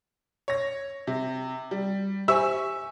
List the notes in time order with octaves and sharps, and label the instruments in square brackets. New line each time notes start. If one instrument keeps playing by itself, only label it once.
[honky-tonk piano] C#5 A#6
C3
G3
[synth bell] G4 C5 G#5 [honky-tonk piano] E5 C#6 [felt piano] E6